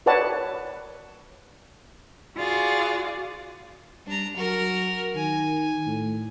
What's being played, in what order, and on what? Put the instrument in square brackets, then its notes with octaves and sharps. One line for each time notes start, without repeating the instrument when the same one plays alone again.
[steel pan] A#4 B4 C#5 D5 F#5 A5
[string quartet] F4 F#4 G#4 D5
[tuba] G3 [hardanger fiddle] D4 A#5
[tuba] F#3 [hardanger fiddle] F#4 A#4
[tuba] D#3 [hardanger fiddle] G#5
[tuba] A2